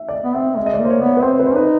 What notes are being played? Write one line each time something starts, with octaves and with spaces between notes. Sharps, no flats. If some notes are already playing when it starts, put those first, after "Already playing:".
Already playing: E5
D5
D#5
B3
C4 E5
G#3 E5
D#5
D5
A#3
C5
C#5
B3 D5
C#5
B4
C4 C5
B4
C5
D#4 B4